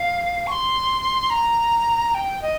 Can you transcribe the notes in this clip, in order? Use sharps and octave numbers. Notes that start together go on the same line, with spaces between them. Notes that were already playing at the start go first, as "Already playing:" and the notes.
Already playing: F5
C#6
C6
A#5
G5
D#5